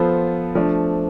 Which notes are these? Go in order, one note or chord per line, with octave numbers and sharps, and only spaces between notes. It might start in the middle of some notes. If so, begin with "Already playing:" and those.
Already playing: F3 B3 F4 A4 C5
F3 A3 D4